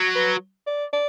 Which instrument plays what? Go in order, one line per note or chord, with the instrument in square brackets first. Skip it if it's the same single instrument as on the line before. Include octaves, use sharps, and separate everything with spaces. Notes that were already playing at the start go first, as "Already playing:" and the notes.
Already playing: [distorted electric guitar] F#3
[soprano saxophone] B4
D5
D5